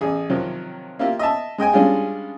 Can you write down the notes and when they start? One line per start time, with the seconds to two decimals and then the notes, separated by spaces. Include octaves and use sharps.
0.01 A1 G#4
0.30 C3 D#3 F3 F#3
0.99 A#3 E4 F4 G4
1.19 D#5 E5 A5
1.58 G#3 D#5 G5 G#5
1.73 G3 G#3 C#4 D4 F4 G#4